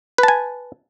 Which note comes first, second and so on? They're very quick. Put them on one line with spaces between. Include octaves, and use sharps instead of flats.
B4 A5 G#5